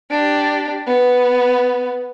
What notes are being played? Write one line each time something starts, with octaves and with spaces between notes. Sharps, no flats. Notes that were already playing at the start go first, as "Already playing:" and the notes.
D4 G4
B3